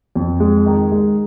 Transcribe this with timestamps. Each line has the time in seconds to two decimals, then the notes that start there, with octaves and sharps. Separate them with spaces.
0.15 F2
0.40 G#3
0.66 D#3
0.92 G#3